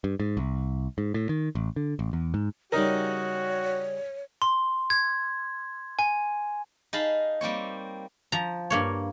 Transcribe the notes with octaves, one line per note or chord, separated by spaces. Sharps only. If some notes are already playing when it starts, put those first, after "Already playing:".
G2
G#2
C2
G#2
A2
D#3
A1
D3
A1
E2
G#2
C#3 G3 D#4 F#4 A#4 C#5
C6
G#6
G#5
D#4 G#4 F5 A5 B5
G3 A#3 C4 C#5
F3 A#5
G2 A#3 C#5